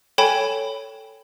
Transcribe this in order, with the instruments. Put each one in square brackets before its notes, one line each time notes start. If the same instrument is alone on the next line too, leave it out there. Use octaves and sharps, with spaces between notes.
[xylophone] A4 C#5 G5 G#5 B5 E7